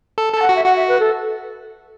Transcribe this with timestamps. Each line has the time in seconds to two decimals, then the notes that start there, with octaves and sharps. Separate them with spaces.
0.18 A4
0.34 A4 A5
0.42 F#5
0.49 F#4
0.56 E5
0.65 F#4 F#5
0.76 E5
0.88 B4
1.00 A4